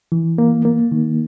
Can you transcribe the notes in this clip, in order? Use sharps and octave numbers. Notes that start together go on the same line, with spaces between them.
E3
A#3
A#3
D#3